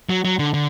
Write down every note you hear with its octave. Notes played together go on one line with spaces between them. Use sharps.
F#3
F#3
D3
D3